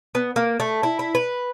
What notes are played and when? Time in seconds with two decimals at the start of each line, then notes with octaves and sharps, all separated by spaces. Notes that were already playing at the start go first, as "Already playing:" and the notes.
0.15 B3
0.36 A#3
0.60 A3
0.83 E4
0.99 E4
1.15 B4